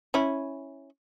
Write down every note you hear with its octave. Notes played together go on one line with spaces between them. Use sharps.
C#4 E4